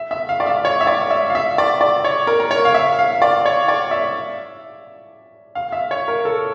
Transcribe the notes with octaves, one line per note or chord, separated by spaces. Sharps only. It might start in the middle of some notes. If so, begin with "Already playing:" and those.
Already playing: E5
E5
F5
D5
E5
C#5
E5
D5
E5
F5
E5
D5
D5
C#5
A#4
A#4
C#5
F5
E5
F5
D5
C#5
D5
E5
F5
E5
C#5
A#4
A4